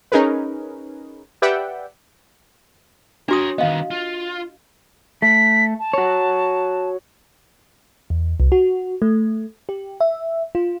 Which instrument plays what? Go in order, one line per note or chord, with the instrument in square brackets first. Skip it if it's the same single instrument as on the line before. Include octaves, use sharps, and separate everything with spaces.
[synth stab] C#4 D#4 G#4 A#4 B4
G4 B4 D5 E5 F#5 G5
[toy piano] D4 F#4 D#6 [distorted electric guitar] A#4 C#5
[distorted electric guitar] D#3 B3 [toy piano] D#5 F5
[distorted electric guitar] F4
[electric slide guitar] A3 [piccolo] B6
[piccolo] A5
[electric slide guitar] F#4 C#5
[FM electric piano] E2
C2
F#4
A3
G4
E5
F4